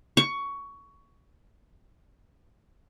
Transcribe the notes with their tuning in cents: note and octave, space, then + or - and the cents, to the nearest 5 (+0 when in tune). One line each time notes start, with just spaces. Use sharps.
C#6 +15